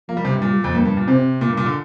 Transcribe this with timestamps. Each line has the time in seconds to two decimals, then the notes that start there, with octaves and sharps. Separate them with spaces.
0.09 F3 A#3
0.17 G3
0.25 C3
0.33 G2
0.42 A#2 G3
0.64 F2
0.74 G2 A#3
0.85 G2
0.97 A#2
1.08 C3 C4
1.41 A#2 A#3
1.49 G2
1.57 A#2
1.66 D3